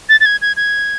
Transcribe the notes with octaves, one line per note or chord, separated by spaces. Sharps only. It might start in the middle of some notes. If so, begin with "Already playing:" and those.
A6
A6
G#6
G#6
G#6